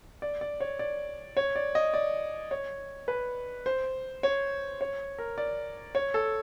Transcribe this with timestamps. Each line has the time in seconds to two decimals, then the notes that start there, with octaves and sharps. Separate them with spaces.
0.22 D5
0.41 D5
0.60 C#5
0.79 D5
1.37 C#5
1.55 D5
1.75 D#5
1.94 D5
2.51 C#5
3.08 B4
3.66 C5
4.23 C#5
4.81 C#5
5.18 A#4
5.38 D5
5.95 C#5
6.14 A4